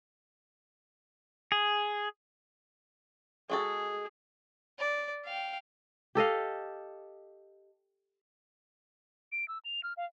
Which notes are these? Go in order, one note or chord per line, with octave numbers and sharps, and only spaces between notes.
G#4
G#3 F#4 G#4 A4
D5
F5 G5
G4 A4 D#5 F5
D7
E6
F7
F6
F5